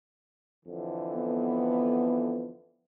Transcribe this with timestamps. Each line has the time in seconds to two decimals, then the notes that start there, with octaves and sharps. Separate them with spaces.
0.65 F2 D3 E3
1.15 B3